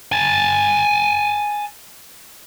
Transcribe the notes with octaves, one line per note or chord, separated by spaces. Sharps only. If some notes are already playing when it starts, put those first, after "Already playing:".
G#5 A5